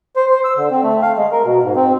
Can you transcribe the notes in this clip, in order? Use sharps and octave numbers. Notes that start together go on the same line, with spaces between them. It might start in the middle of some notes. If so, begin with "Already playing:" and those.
C5
C5
E6
D3
C4
A3
F5
G#3
A#4
B2
G#2
C4